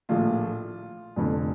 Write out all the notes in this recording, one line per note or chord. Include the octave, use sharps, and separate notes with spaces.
A#1 A2 F3 A#3 F4
F1 F2 D3